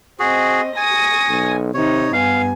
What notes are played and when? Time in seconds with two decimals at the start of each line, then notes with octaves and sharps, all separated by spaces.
0.20 C4 F#4 G#4 D#5
0.76 G#5 C#6 D#6 A#6
1.29 B1
1.74 C3 D#3 D#4 C#5
2.13 G2 B3 F5 G#5